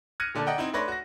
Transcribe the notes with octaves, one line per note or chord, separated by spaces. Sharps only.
F6 F#6 G#6 A#6 C#7 D#7
A#2 D3 D5 A5
D5 D#5 F#5 G5 A#5
C4 D#4 E4
A3 D4 B4 C#5 C6 A#6
F#4 A#6